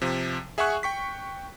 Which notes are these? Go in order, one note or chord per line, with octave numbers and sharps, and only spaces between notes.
C3 F3
G#4 E5 F#5 G#5 C#6 F#6
G5 C#6 B6